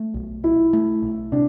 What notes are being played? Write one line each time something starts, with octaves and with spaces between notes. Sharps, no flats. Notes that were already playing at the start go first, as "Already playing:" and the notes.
Already playing: A3
B1
B1 E4
A3
B1
C3 D4